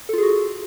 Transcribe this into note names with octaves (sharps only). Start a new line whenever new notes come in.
F4 F#4 G#4 A4